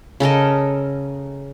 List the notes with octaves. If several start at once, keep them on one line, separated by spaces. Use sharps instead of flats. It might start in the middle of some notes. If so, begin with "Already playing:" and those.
C#3 A4 A#4 D#5